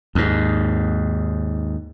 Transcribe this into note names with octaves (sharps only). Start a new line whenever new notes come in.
D#2 G#2